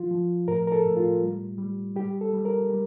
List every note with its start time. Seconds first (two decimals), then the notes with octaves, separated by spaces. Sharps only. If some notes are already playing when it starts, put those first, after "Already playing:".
Already playing: F3 F4
0.11 F3
0.48 A2 A#4
0.67 A#4
0.72 A4
0.85 A2
0.97 F4
1.22 G3
1.58 G3
1.96 G3 G4
2.21 A4
2.33 G3
2.45 A#4
2.70 G3